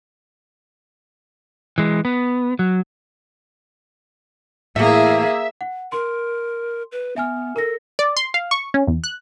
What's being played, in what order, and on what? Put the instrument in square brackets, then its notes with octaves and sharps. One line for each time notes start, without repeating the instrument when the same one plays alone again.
[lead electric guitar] E3 G#3
B3
F#3
[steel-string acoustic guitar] A2 E3 E4 [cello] A#3 G#4 [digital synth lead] E5
[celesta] F#5
[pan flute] A#4 [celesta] C6
[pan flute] B4
[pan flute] B3 [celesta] E5 G#5 F6
[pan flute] A4 [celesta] A#4 A#6
[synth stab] D5
C6
F5
C#6
C#4
E2
F#6